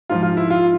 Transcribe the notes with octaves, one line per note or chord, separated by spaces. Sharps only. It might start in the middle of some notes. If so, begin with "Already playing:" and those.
G#2 F3 F4
F4
E4
F4